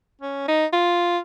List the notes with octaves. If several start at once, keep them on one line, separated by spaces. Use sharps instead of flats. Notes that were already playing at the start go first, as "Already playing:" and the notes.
C#4
D#4
F4